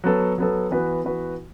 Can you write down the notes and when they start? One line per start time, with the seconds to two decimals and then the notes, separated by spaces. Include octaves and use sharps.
0.04 F#3 B3 A4
0.38 F#3 B3 A4
0.71 E3 B3 F#4 B4
1.04 E3 B3 F#4 B4